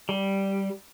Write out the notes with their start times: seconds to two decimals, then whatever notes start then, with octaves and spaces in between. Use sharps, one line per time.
0.09 G3